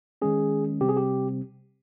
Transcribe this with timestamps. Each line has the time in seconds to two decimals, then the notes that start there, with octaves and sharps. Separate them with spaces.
0.22 D#3 G#3 C#4 G#4
0.81 C3 G3 C4 G4
0.89 G#4
0.97 G4